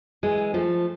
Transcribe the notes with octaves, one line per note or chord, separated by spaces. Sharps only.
E3 G#3
F3 A3